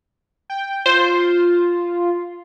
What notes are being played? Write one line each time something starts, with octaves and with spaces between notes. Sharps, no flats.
G5
F4 C5